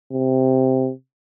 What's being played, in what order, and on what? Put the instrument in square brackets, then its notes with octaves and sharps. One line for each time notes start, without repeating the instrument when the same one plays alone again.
[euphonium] C3